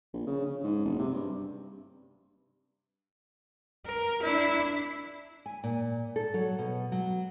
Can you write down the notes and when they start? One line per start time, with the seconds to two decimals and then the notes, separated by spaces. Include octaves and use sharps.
0.13 A#1
0.27 C#3
0.46 C#3
0.64 G#2
0.85 F#1
0.99 C3
1.14 G2
3.86 A#4
4.22 D4 E4
5.46 G#5
5.64 A#2
6.16 A4
6.34 F#3
6.59 B2
6.92 F#3